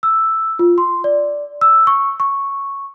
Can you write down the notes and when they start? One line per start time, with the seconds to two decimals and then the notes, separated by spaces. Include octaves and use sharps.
0.03 E6
0.59 F4
0.78 C6
1.04 D5
1.61 E6
1.87 C#6
2.20 C#6